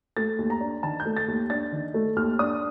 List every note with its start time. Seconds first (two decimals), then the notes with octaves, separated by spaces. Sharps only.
0.17 A3 A6
0.39 D#2
0.50 A#5
0.61 D4
0.83 D#3 A5
1.00 G6
1.06 A3
1.17 A6
1.28 D#2
1.50 D4 A6
1.73 D#3
1.94 A3
2.16 D#2 F6
2.39 D4 D#6